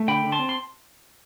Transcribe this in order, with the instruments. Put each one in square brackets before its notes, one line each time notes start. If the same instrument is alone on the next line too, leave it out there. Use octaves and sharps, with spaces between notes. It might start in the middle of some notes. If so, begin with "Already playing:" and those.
Already playing: [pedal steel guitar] A3
D3 G5 B5
D3
A5 C6
C4
C6